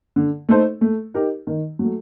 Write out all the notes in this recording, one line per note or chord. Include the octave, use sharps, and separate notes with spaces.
D3
A3 D#4 A4 C5
A3
D#4 G4 A#4
D#3
F#3 A3